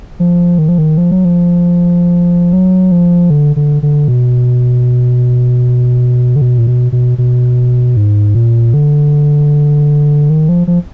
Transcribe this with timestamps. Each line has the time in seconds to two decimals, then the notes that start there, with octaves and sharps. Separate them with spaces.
0.20 F3
0.59 D#3
0.69 F3
0.78 D#3
0.98 F3
1.11 F#3
1.25 F3
2.53 F#3
2.92 F3
3.30 D3
3.56 D3
3.83 D3
4.08 B2
6.36 D3
6.42 B2
6.58 A#2
6.67 B2
6.92 B2
7.18 B2
7.97 G#2
8.35 A#2
8.74 D3
10.30 D#3
10.49 F3
10.67 F3